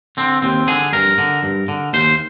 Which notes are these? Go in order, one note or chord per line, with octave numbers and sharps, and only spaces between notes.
D3 C4
D#2 C4
D3 G#4
G2 A#4
D3
G2
D3
D#2 C5